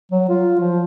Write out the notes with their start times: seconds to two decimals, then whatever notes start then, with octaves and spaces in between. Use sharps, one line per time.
0.11 F#3
0.29 F4
0.60 F3